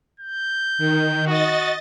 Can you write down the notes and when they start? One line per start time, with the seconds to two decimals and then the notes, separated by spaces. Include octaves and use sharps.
0.20 G6
0.78 D#3
1.27 F#4 D#5 A6